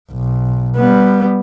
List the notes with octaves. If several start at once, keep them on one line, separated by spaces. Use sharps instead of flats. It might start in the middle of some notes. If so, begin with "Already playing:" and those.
B1
G3 B3